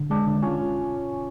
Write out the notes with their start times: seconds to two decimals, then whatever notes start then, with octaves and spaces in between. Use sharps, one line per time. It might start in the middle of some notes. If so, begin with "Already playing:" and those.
Already playing: D3
0.10 G#3 D4
0.27 D3
0.42 C#4 F4